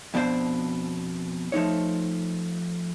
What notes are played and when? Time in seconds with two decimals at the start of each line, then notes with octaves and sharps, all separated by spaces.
0.14 F2 B2 D4 E4 C5
1.52 F3 A3 D#4 C#5